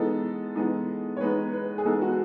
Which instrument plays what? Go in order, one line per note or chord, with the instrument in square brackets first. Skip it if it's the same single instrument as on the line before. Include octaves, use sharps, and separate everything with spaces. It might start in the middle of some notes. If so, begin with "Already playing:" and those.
Already playing: [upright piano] E3 G#3 B3 D#4 A4
E3 G#3 B3 D#4
C#5
E3 G#3 B3 D#4 B4
B4
G#4
E3 G#3 B3 D#4 A4
F#4